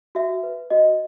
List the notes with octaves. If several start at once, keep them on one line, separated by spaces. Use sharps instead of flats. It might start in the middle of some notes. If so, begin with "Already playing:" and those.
F#4 E5
B4
F#4 D#5